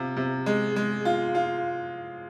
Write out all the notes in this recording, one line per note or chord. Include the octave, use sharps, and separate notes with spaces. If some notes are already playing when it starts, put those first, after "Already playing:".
Already playing: C3 F4
C3
G#3
G#3
F4
F4